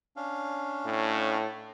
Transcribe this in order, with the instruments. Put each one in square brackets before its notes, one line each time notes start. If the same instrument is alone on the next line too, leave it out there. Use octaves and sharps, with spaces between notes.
[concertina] C#4 D4 F5
[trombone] A2